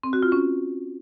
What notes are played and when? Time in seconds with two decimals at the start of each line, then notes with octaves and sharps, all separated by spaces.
0.03 C4
0.13 F#4
0.23 F4
0.32 C#4